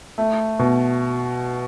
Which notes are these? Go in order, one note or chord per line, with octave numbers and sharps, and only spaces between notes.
A3
B2